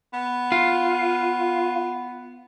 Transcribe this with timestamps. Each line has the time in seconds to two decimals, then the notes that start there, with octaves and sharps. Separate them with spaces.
0.13 B3
0.52 F4